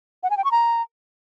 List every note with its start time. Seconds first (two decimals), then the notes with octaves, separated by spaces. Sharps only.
0.23 F#5
0.30 G#5
0.37 G5
0.44 C#6
0.51 A#5